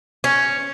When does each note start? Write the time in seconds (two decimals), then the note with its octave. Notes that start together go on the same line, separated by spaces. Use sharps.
0.24 C#4